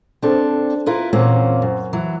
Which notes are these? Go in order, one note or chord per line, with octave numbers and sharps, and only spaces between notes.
C4 D4 A4
E4 F4 A#4 B4
E2 A#2 A#3 C4 C#4
F#2
E3 F#3